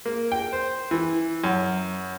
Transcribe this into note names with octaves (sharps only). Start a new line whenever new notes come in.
A#3
G5
C5
E3
F#2